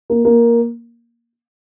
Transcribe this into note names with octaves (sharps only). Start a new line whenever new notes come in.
A#3
A#3